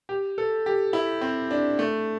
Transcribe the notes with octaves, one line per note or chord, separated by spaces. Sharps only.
G4
A4
G4
E4
C4
D4
A3